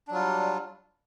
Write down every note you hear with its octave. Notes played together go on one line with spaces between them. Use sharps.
F#3 G3 D4 F4